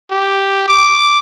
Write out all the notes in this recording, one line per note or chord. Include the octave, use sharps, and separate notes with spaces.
G4
D6